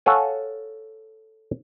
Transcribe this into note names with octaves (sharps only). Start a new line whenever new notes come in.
A4 C#5 F5 F#5 G#5